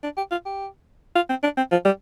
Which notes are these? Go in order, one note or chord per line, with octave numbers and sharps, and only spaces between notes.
D4
G4
F4
G4
F4
C4
D4
C4
F3
G3